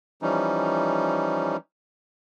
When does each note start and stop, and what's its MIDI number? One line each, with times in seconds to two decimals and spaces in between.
0.22 1.57 52
0.22 1.57 53
0.22 1.57 55
0.22 1.57 61
0.22 1.57 63